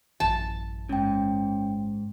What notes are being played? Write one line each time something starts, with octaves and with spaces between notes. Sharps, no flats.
A1 F#2 E3 A5
G#2 C#4 G5